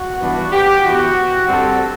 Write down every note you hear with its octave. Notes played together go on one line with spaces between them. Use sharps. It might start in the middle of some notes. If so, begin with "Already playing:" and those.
Already playing: F#4
G2 E3 B3 D4
G4
E3 B3 E4 F#4
G2 D3 G3 C4 A4